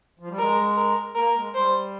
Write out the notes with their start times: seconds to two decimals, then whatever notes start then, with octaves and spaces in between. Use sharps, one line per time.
0.19 F3
0.29 G3
0.39 G#3 A#4
0.77 A#4
1.15 A#3 A#4
1.36 G#3
1.55 G3 C5